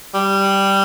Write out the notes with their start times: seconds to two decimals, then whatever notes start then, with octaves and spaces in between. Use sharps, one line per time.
0.14 G3